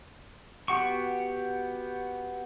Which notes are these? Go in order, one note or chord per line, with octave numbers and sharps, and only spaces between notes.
B3 F#4 G4 F#5 C#6